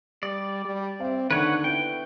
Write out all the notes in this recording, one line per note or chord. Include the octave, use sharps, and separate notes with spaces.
G3 D5
G3
C4 E5 F5
D#2 D3 D#3 B4 C#5 F#5
B3 E4 G5